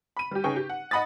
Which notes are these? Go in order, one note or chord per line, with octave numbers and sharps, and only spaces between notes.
B5 D#7
G3 G4
C#3 D#4 G#4 B4 G5 C#6
G4
F#5
D#5 F#5 B5 D#6 A6